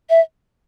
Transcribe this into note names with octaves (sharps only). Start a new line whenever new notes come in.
E5